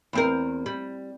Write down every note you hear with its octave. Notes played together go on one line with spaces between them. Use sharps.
E2 C4 A#4
G3